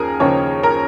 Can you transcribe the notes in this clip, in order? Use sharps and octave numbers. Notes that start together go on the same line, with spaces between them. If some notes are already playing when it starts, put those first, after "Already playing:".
Already playing: D#2 C#3 F3 G#4 A#4
D#2 C#3 F3 C#5
A#4